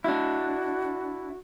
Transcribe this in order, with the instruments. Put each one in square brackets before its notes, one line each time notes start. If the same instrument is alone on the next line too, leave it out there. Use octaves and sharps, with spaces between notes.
[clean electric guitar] D4 E4 [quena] F#4